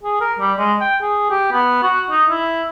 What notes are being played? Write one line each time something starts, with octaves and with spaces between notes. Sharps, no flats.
G#4
A#4
G3
G#3
G5
G#4
G4
B3
F#4
D#4
E4